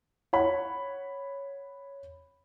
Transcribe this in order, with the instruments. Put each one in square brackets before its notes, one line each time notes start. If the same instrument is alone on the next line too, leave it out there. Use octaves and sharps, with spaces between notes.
[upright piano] C#5 F#5 B5